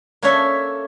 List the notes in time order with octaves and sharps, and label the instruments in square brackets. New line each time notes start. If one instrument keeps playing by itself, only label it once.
[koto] A#3 C#4 D4 A4 C#5 E5